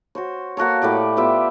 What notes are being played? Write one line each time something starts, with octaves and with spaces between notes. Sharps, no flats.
F#4 C5 C#5
A#3 F#4 A4 C#5
A2 E4 G4 D5
B3 F4 G4 E5